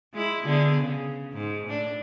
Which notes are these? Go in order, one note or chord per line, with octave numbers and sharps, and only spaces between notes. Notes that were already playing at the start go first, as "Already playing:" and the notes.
G#3 E4
D3 B3 G#4
C#3
G#2
A2 D4